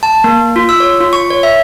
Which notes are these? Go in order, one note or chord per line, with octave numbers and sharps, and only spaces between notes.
A5
A#3
F4
E6
C#5
F4
C#6
C#5
E5